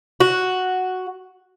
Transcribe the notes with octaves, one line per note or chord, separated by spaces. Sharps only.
F#4